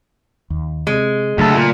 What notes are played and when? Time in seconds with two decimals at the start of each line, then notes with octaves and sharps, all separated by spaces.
0.50 D#2
0.87 C3 G#3
1.38 D2 C#3 F#3 A3 A4
1.55 A#2